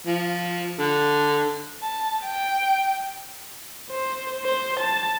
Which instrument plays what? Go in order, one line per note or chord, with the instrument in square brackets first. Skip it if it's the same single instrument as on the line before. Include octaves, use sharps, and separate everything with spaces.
[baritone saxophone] F3
D3
[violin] A5
G5
[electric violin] C5
C5
A5